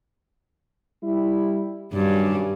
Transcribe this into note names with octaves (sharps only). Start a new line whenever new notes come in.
G3 E4
G2 D#3 F#3 C#4